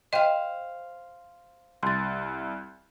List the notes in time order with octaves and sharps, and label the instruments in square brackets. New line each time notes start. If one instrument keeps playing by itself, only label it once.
[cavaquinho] C5 F5 [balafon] D#5 G5
[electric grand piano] C2 [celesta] C6 A6